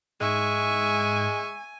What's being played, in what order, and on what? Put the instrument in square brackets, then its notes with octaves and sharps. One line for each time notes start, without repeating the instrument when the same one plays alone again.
[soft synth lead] G#2 [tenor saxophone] G#3 [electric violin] E5 C#6 [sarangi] G#5